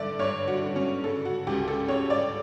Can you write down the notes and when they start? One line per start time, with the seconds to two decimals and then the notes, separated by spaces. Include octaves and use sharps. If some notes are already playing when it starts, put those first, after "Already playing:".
Already playing: G2 D3 D5 E5
0.19 G2 C#5
0.48 F#4
0.62 D3
0.76 C#4
1.04 C#3 A4
1.25 F#4
1.47 C#2 G4
1.68 A4
1.88 C#3 C#5
2.10 D5